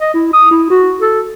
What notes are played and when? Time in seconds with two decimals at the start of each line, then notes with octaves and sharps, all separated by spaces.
0.01 D#5
0.14 E4
0.33 D#6
0.51 E4
0.70 F#4
1.00 A4